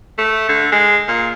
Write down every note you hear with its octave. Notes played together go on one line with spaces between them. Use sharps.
A3
D3
G#3
A#2